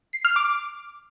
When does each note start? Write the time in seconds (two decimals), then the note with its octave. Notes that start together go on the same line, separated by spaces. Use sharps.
0.13 C7
0.25 F6
0.36 D6